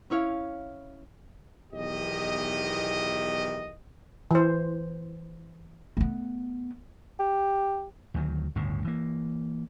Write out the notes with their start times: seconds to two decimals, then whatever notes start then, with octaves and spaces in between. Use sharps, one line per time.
0.10 C#4 E4 C#5 F5
1.73 B1 E2 D#3 E3 G4 D#5
4.31 E3 C5
5.97 A3 B3
7.20 G4
8.14 D2 D#3 F#3
8.55 G1 D2 A2 C#3
8.84 E3 A#3